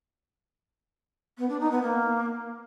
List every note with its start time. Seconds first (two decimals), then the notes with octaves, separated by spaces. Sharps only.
1.38 B3
1.49 D4
1.60 D#4
1.71 B3
1.82 A#3